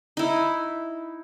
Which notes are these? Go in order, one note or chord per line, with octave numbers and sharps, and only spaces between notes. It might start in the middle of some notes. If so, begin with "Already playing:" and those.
D#4 E4